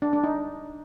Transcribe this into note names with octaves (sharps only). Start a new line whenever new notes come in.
D4
D4
D#4